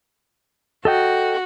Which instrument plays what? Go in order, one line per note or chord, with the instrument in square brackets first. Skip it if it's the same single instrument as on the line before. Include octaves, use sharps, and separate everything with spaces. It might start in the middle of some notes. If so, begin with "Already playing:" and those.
[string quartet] F#4 [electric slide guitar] A4 D#5 G5